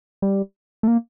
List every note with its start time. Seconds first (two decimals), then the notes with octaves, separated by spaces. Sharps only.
0.22 G3
0.83 A3
0.88 A#3